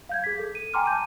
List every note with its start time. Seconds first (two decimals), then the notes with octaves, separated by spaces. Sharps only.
0.09 F5 G6 G#6
0.24 G#4 B6
0.39 A4
0.55 D#7
0.74 G5 G#5 A#5 C6 D6 F6
0.86 A5 G6 D#7